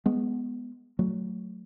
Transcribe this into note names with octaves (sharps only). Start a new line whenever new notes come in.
G#3 B3
F#3 A3